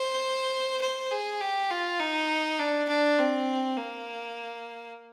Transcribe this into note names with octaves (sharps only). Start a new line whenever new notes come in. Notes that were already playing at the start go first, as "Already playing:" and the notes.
Already playing: C5
C5
G#4
G4
F4
D#4
D4
D4
C4
A#3